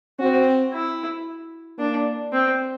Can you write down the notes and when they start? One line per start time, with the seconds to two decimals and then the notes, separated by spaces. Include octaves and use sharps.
0.19 C4 F#4
0.73 E4
1.78 A#3 D4
2.33 C4